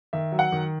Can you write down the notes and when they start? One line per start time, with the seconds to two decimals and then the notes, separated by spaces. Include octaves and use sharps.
0.13 D#3 E5
0.32 F#3
0.39 F#5
0.52 D#3